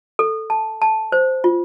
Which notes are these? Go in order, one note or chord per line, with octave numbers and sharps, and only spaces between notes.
A4
A5
A5
C5
F4